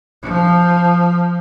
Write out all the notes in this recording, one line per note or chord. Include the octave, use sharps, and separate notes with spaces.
F3